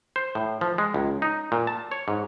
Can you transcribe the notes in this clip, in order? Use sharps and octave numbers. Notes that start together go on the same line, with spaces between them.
C5
A2
F3
G#3
C#2
D#4
A#2
A5
C#5
G#2